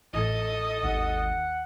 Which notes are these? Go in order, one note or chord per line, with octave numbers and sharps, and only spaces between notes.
A1 A2 A4 D#5
G#1 D#2 F#5